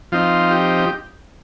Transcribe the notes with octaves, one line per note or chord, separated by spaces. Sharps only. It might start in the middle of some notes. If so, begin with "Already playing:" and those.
F3 C4 D#4 F4
G4